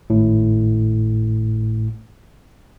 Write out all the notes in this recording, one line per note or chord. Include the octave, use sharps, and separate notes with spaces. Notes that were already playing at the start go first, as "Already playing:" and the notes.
G#1 A2